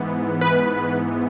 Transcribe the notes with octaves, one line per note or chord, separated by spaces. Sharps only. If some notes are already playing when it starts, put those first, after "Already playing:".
Already playing: G#2 E3 B3
B4